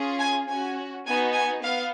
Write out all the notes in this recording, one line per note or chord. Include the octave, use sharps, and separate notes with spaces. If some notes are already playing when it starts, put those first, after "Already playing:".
Already playing: C#4 F4 G#4
G#5
C#4 F#4 G#5
B3 D#4 F#4 G#5
G#5
B3 F5